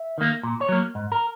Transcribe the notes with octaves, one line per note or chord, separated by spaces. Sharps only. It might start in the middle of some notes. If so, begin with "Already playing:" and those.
Already playing: E5
D#3 A#3
A#2
C#5
F#3 A#3
G#2
A#4